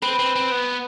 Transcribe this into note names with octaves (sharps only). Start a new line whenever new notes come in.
C4 B4
C4
C4
B3